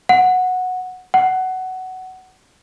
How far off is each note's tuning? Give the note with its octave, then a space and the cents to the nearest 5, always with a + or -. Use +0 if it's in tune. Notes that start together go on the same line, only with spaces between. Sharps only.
F#5 -10
F#5 +15